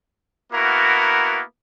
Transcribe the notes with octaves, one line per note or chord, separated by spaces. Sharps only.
A#3 B3 E4 F#4 A#4